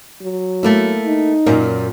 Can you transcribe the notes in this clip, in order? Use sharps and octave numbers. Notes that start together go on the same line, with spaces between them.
F#3
A3 A#3 E4
D#4
F#2 A#2 A#3